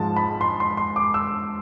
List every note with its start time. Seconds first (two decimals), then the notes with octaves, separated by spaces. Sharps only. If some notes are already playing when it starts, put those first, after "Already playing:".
Already playing: G#2 F3 G#3 A5
0.16 B5
0.41 C6
0.60 C6
0.77 C6
0.96 D6
1.14 E6